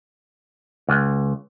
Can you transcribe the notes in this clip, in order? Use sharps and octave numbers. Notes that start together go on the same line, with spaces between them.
C#2